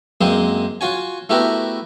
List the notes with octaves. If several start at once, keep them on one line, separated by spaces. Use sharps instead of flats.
F#2 G#3 A#3 C4 C5 D#6
F4 F#4 C#5 G#5
A3 B3 E4 F#4 G4 A#4